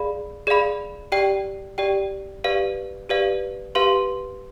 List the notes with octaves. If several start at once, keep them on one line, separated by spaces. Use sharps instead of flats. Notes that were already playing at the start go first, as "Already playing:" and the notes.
Already playing: G#4 D5 F5 B5
G#4 D5 F5 B5
G4 D5 G5
G4 D5 G5
G4 B4 D5 F5
G4 B4 D5 F5
G4 B4 F5 C6